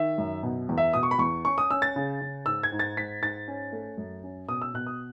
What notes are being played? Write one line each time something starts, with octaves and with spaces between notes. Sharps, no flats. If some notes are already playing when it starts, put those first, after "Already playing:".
Already playing: D#3 E5
F#2
B2
E2
E5
B2 D#6
C#6
B5
E2 C#6
C#4 C#6
D#6
C#4 E6
A6
C#3
C#3
G#2 E6
G#6
G#2
A6
G#2 B6
G#2 A6
C#4
A3
F#2
C#4
B2 D#6
E6
B2 F#6
D#6